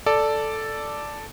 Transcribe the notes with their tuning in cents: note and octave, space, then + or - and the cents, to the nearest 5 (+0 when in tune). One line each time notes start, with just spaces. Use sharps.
A4 +0 D5 +0